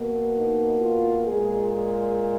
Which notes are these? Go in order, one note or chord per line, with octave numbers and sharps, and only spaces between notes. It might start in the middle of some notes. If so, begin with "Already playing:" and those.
Already playing: B2 A#3
D#4
F4
A#2 G#3 G#4
G#4